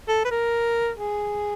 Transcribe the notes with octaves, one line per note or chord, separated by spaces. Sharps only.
A4
B4
A#4
G#4